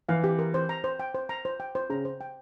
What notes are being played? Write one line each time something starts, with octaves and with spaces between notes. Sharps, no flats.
E3 F5
G4
A#4
C5
A#5
C5
G5
C5
A#5
C5
G5
C5
C#3 A#5
C5
G5